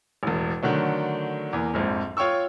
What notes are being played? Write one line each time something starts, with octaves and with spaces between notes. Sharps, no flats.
E1 A1
D3 D#3 F#3 A3
E2 A#3
A#1 F2 G#2
F4 C#5 G5 C#6 E6